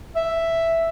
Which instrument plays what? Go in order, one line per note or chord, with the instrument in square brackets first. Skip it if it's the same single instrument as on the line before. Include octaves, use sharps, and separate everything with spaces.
[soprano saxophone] E5